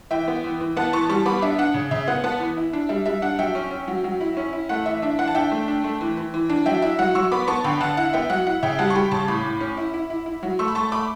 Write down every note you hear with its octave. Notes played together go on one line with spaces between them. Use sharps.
E3 E5 G5
B3
E3
E3
B3 F#5 A5
E3 A5 C#6
G3 A5 C#6
B3 B5 D6
D4 E5
D4 F#5
C#3
C#3 E5
B3 F#5
B3 F#5 A5
E3
E4
D4
G3 E5
G3 E5
D4 F#5
F#3 E5 G5
C#4
C#4
F#3
F#3
E4
C#4
E4
A3 F#5
E3 E5
D4 E5
E3 F#5
A5
D4 E5 G5
A3
D4
A3
E3
E3
E3
D4
F#3 E5 G5
E4 E5
F#3 F#5
F#3 C#6 E6
B3 B5 D6
B3 A5 C#6
D3 G5 B5
D3 F#5 A5
E4 F#5
B3 E5 G5
F#3 F#5
E4 F#5
C#3 E5 G5
G3 F#5 A5
C#6
G3 G5 B5
C#3 A5 C#6
A2 B5 D6
A2
C#4
E4
E4
E4
E4
F#3
A3 C#6 E6
B5
A3 A5 C#6
A3 B5 D6